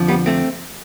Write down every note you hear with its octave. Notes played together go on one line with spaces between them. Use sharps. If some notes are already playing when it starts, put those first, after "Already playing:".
Already playing: F2 D3 F3
G3 B3
A3 C4